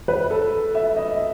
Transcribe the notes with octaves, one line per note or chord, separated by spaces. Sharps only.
B4
A4
E5
D#5